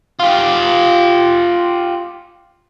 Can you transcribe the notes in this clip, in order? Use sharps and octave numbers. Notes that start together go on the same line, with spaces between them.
F4 G4